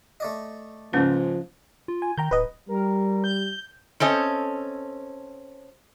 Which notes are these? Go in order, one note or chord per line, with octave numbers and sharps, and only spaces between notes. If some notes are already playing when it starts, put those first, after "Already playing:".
A3 D5 D#5
C#2 G#2 F3 A#3 C#4 B4
F4
G#5
D#3 G5 A#5 G6
D1 B4 D#5
G3 A#4
G6
C4 C#4 A4 D#5